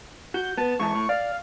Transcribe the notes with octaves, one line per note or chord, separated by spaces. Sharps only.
F#4 G6
B3 A5
G#2 E3 A5 C#6
A2
D5 F5